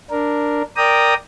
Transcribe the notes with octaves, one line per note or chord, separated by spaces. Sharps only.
D4 A#4
A#4 D5 G5 A#5 D#6